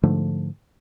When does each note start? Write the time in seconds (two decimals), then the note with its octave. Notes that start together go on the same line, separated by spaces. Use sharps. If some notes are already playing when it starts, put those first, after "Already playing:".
0.03 G#2 D3 F3 A3